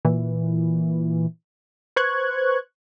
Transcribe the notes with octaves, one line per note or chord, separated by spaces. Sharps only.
A#2 E3
B4 C5 C#6 F#6 G#6